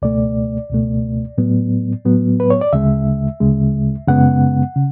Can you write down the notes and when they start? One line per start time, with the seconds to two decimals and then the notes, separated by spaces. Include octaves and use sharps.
0.02 C#2 B2 A3 D5
0.70 C#2 B2 A3
1.38 A2 F#3 B3
2.05 A2 F#3 B3
2.40 B4
2.50 C#5
2.61 D5
2.73 D2 C#3 G#3 E5
3.40 D2 C#3 G#3
4.08 F#2 C#3 G#3 B3 F#5
4.76 C#3